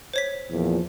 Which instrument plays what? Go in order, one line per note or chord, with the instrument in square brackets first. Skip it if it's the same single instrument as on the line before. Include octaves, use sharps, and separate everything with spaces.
[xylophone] C5 C#5 B6
[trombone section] E2 A#2 F3